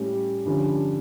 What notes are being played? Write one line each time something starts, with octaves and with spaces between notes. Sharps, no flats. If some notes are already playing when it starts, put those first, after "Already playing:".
Already playing: A2 G3 C#4 G4
G2 D3 F3 C#4